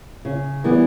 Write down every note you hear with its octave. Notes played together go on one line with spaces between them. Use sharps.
C#3
E3 G3 B3